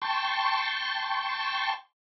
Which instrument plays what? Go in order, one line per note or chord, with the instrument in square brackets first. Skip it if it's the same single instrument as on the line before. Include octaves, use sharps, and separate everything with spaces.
[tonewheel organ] G5 A5 C6 C#6